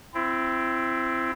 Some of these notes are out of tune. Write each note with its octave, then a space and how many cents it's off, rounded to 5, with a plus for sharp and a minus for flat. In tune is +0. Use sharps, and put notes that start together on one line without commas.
C4 +0 E4 +30